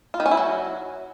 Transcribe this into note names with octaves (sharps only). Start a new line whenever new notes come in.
F4
D#3
C#4
E4
F#3